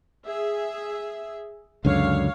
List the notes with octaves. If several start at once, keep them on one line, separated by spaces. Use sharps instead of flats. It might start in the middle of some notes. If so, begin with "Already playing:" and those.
G#4 E5
C#2 F#2 D3 C#5 F5